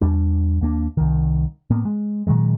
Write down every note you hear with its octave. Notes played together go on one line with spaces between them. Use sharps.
E2 G3 D4
D#2 A#3 D4
C2 D#3
A2 A#3 B3
G#3
A#2 D#3 F#3 G#3